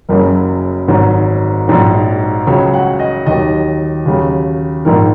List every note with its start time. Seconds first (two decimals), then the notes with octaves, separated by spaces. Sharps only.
0.09 F#1 F#2 C#3 F#3 A#4
0.88 G#1 G#2 F#3
1.68 A#1 G#2 F#3
2.47 C#2 C#3 F#3 C#5
2.74 F#5
2.99 D#5
3.26 D#2 D#3 F#3 D#5
4.06 D#2 C#3 F#3
4.85 A#1 G#2 D#3 A#4